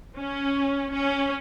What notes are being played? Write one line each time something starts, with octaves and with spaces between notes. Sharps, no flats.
C#4
C#4